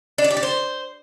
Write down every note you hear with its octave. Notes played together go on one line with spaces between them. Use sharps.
D4
D5
G4
D5
C5